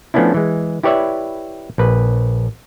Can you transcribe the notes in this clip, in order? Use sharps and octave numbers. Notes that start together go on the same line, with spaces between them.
F3 A3 B3 C#4 D4 E4
E3 G#3
E4 G4 B4 C#5 D5 E5
A#1 B4